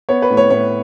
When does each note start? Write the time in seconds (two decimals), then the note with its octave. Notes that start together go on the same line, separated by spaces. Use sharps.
0.09 B3 C#5
0.22 B4
0.30 A2
0.37 C#5
0.50 A2 C#5